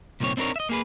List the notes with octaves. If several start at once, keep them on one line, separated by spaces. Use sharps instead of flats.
C2 A#2 D#3 C4 C#5
C4 D4 D#4 A#4 C#5
D#5 E5
A#3 G#4 B4